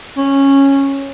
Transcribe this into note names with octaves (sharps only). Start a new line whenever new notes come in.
C#4